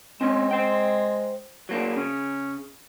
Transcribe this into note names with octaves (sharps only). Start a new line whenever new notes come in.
G#3 C4 C#4
C5 G5
F#3 A#3 D4
C#3 C#4